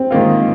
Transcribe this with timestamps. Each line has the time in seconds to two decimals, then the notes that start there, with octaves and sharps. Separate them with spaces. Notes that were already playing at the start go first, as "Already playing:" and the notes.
Already playing: C4
0.11 G#2 D#3 A#3 F4